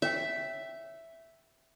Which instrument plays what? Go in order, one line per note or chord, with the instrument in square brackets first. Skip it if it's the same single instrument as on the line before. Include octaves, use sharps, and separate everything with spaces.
[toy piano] C#5 G5 [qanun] E5